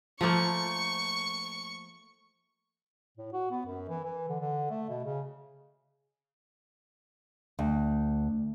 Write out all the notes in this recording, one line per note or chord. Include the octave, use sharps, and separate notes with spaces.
F3 A3 A#3 C#6
A2
F#4
B3
F#2
E3
E3
D3
D3
A3
B2
C#3
D2